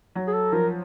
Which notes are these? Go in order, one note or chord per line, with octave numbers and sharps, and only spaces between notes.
F#3
G#4
A4
F3 A#4